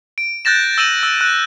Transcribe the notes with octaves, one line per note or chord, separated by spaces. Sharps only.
D7
F#6 G6 A6 A#6 E7
E6 A6 D#7 E7 F#7
E6
F#6